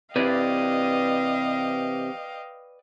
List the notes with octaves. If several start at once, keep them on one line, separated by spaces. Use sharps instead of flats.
C3 E3 B4 D5 D#5 F5 G5